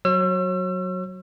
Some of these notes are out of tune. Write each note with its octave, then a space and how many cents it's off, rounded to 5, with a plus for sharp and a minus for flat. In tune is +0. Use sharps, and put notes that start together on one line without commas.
F#3 +0 C#5 -35 E6 +35